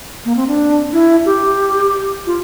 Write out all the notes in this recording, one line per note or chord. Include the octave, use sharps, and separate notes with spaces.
A#3
C4
D4
E4
G4
F4